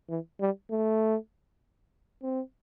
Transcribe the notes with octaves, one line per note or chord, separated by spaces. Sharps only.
E3
G3
A3
C4